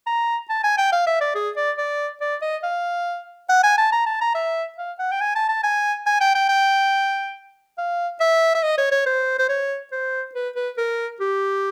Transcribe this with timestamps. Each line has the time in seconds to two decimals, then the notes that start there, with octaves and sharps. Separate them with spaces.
0.07 A#5
0.49 A5
0.64 G#5
0.78 G5
0.92 F5
1.07 E5
1.21 D5
1.35 G#4
1.56 D5
1.78 D5
2.21 D5
2.42 D#5
2.63 F5
3.49 F#5
3.63 G#5
3.78 A5
3.92 A#5
4.06 A5
4.21 A#5
4.35 E5
4.78 F5
4.99 F#5
5.12 G5
5.21 G#5
5.35 A5
5.49 A5
5.63 G#5
6.06 G#5
6.21 G5
6.35 G5
6.49 G5
7.78 F5
8.20 E5
8.55 E5
8.63 D#5
8.78 C#5
8.92 C#5
9.06 C5
9.39 C5
9.49 C#5
9.92 C5
10.34 B4
10.56 B4
10.78 A#4
11.20 G4